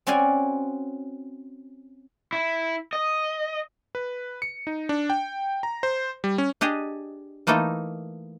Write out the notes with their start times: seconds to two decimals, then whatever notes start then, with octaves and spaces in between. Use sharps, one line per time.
0.07 C4 C#4 F#4 D5 F5 G#5
2.33 E4
2.93 D#5
3.95 B4
4.42 C#7
4.67 D#4
4.89 D4
5.10 G5
5.63 A#5
5.83 C5
6.24 G3
6.38 C#4
6.61 D4 G4 G#4 D#5
7.47 E3 A3 A#3 D#4 A4